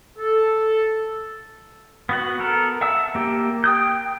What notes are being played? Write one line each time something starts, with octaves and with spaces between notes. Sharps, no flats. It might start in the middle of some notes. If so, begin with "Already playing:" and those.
A4
B3 F#4 F#5
B3 A4 A#4
E5 F#5 A5 E6
A#3 G4
G5 D#6 G6